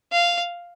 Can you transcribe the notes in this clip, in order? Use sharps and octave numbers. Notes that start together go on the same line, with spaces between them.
F5